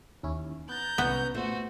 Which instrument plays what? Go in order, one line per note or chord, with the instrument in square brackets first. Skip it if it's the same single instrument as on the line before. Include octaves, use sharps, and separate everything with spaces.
[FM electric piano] D#2 C#4 E4
[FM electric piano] B3 F#6 A6 [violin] A#5 G6
[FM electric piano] C2 [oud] E3 C#4 B4 [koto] B3
[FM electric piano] A#2 [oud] A3 [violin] F#4 C5